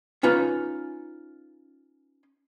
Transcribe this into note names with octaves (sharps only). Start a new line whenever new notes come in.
C#4 D#4 F4 B4